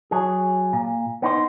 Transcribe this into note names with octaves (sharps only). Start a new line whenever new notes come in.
F#3 G#4
A#2
B3 D#4 C5